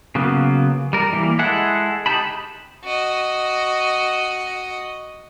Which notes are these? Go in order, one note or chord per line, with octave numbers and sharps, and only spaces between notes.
C#3 F#3 A#3 B3
G3 A#4
E3 G3 A#3
G#3 E4 G#4 A4 F#5
D#4 G4 A5 B5
F#4 D#5